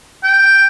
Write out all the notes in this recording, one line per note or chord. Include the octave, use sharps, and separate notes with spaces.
G5